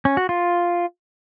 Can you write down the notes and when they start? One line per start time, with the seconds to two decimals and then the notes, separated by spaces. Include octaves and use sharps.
0.05 C#4
0.17 F#4
0.29 F4